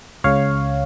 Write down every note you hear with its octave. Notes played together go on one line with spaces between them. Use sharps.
C#2 C#3 C#5 F5